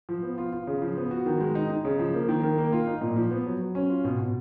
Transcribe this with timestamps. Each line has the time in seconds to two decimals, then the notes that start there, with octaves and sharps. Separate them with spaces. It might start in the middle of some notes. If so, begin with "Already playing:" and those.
0.09 F3
0.23 B3
0.38 F4
0.52 F4
0.67 C#3
0.82 F3
0.97 B3
1.11 F#4
1.26 D#3
1.41 G#3
1.55 D#4
1.70 D#4
1.85 C#3
1.99 F3
2.14 A#3
2.29 D#3
2.43 D#3
2.58 A#3
2.73 F4
2.87 D#4
3.01 A#2
3.16 F3
3.31 B3
3.46 F#3
3.61 F#3
3.75 C#4
3.90 F4
4.04 B2
4.19 B2